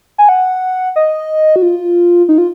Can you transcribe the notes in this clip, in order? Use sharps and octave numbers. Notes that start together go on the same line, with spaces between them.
G#5
F#5
D#5
F#4
F4
D#4
F4